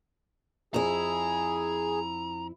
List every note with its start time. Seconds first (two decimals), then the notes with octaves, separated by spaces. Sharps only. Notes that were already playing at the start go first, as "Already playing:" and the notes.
0.74 F2 E4 G#4 A#5